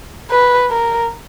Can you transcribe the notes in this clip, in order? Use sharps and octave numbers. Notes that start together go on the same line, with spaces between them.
B4
A#4